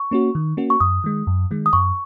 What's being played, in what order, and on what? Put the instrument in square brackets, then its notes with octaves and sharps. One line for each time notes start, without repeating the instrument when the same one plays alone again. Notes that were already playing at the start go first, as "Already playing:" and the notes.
Already playing: [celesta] C#6
[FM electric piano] A#3 C#4 F#4
D#3
A#3 C#4 F#4
[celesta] C#6
[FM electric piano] F#2 [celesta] D#6
[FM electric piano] D#3 G#3
F#2
D#3 G#3
[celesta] D#6
[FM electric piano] F#2 [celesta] C#6